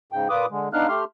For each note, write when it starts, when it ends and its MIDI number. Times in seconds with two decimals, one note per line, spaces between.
0.12 0.28 44
0.12 0.28 49
0.12 0.28 79
0.30 0.46 46
0.30 0.46 65
0.30 0.46 71
0.30 0.46 86
0.30 0.46 87
0.51 0.69 50
0.51 0.69 56
0.73 0.87 59
0.73 0.87 62
0.73 0.87 63
0.73 0.87 77
0.73 0.87 89
0.73 0.87 90
0.88 1.04 57
0.88 1.04 67
0.88 1.04 84
0.88 1.04 89